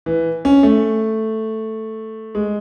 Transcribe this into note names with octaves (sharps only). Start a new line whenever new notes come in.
E3
C#4
A3
G#3